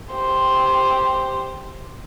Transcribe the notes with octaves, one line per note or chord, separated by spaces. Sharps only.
G4 C5